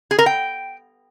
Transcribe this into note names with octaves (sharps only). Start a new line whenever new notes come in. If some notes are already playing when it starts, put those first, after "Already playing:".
G#4
A#4
G5